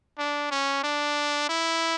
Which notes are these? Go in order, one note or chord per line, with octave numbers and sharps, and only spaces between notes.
D4
C#4
D4
E4